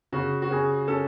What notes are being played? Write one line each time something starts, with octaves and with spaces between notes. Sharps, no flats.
C#3 F#4
F#4
C#3 G#4
C#4 A4